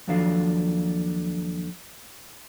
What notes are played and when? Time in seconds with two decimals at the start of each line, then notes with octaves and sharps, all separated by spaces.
0.08 D#2 F3 F#3 D4 A4 F5